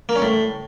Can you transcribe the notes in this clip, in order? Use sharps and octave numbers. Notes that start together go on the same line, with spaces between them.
A#3
C#4
A2